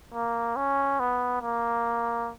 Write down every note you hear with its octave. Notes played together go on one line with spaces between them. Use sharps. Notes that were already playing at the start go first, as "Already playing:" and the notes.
A#3
C#4
B3
A#3